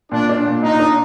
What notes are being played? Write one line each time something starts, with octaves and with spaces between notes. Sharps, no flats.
A#2 D4
D4
A#2
A#2 D#4
D4